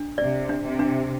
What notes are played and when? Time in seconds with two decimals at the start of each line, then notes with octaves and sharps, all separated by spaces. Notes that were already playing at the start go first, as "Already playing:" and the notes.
Already playing: D4
0.18 C3 D5
0.49 D4
0.64 C3
0.79 D4